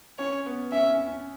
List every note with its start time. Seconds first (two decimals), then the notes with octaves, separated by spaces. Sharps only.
0.19 C#4 C#5
0.46 B3
0.72 C#4 E5
0.90 C#4
1.07 C#4